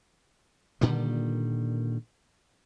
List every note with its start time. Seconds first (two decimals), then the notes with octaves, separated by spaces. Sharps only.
0.81 A#2 D3 D#3 G3